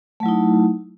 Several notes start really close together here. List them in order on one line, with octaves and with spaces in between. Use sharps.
A3 F#3 E4 D#4